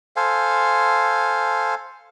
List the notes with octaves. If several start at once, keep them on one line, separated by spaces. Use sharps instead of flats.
A4 C5 F5 G#5